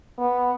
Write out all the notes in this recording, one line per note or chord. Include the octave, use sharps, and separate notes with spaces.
B3